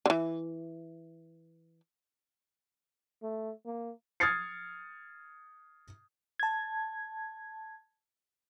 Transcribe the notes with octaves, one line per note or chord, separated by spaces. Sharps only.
D3 E3
A3
A#3
D#6 F6 G#6 A6 C7 C#7
A5 G#6